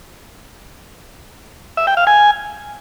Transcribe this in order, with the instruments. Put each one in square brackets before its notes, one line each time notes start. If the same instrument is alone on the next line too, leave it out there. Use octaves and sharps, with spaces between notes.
[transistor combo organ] E5
G5
F5
G#5